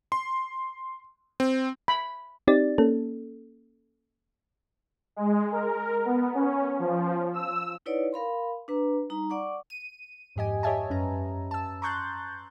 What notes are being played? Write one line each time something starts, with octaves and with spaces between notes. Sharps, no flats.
C6
C4
B5
C4 D#4 G4 D5 A6
A#3 C#4 A4
G#3
A#4
B3
C#4
F3
E6
D#4 E4 B4 C#5 D5 F#5
A#4 F5 B5 C6
D4 B4 A#5
G3 D#4 A#5
D5 F#5 C#6 D6
D#7
F2 G#2 G4 D#5 G#5
G4 C#5 D#5 E5 G#5 A5
F#2 C#4 B4 A#5
A5 E6
A#5 C6 C#6 F#6 G6 A6